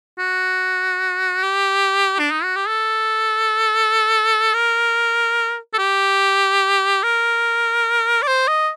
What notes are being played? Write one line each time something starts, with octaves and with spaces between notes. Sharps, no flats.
F#4
G4
D4
D#4
F#4
G4
A4
A#4
A4
G4
A#4
D5
C5
D#5